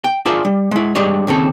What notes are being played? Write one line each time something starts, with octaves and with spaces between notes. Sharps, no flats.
G5
D4 F4 G#4 A#4 C5 E5
G3
G#3 E4
G3 G#3 D4 G4 C#5 D#5
D#2 C#3 C4 A4